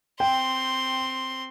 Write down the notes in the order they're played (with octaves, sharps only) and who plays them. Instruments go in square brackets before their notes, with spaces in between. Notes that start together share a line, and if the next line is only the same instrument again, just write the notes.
[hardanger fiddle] C4 C6 [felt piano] G5